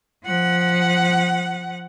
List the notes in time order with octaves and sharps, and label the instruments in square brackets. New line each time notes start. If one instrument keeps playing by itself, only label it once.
[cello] F3 F#5